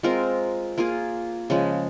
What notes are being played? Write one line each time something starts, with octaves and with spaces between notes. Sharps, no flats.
G#3 C4 F4 A#4
A#3 F4 G#4
C#3 F3 G#3